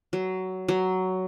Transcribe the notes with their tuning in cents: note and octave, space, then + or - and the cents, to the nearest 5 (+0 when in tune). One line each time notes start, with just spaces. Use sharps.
F#3 +15
F#3 +10